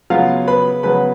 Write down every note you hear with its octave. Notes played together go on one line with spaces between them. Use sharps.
C#3 F#3 B3 F4 F5
B4 B5
C#3 F#3 B3 B4 B5